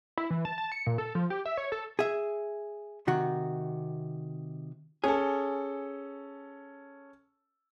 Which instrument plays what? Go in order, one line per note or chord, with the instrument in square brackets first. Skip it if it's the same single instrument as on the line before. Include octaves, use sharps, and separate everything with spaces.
[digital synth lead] E4
E3
A5
A5
C#7
A#2
A4
F3
G4
E5
C#5
A4
[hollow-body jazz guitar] G#4 E5
C3 D#3 F#4
[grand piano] C#4 A4 [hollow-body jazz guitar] G#4